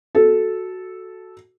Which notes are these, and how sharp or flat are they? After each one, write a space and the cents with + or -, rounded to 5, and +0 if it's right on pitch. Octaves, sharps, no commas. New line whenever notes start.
F#4 +0 A4 -10